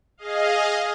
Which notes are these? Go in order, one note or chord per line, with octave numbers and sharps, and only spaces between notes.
G#4 D#5 F5